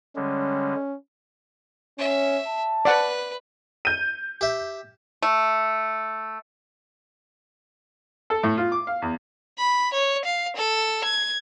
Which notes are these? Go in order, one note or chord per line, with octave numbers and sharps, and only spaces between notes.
D3 G3 G#3 C#4
C#4 E5
A5
B4 D5 F#5
G6 D#7
G4 E5
A3
A4
A2
F4
D6
F5
E2
B5
C#5
F5
A4
G#6